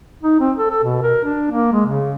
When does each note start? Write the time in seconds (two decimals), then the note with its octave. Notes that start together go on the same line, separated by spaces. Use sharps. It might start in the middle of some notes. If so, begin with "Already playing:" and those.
0.23 D#4
0.40 C4
0.58 A4
0.70 A4
0.84 B2
1.02 A#4
1.25 D4
1.51 A#3
1.72 G#3
1.86 C#3